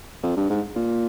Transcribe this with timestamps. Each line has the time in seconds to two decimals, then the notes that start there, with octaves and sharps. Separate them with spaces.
0.23 F2
0.37 G2
0.50 G#2
0.76 A#2